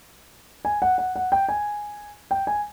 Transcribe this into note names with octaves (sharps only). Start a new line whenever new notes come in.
G#5
F#5
F#5
F#5
G5
G#5
G5
G#5